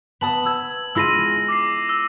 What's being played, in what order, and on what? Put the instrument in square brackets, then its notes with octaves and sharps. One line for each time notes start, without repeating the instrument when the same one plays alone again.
[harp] B3 A5 D#6 [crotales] F#7
[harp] E6 G#6
[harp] G#3 E4 F4 [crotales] E6 A#6 D#7
[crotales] D6 A#6 C7
E6